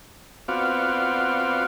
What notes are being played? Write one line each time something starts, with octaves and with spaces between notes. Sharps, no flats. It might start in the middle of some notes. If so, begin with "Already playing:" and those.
B3 C4 F4 F#4 D5 F5